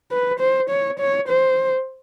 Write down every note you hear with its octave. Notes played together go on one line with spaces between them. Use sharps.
B4
C5
C#5
C#5
C5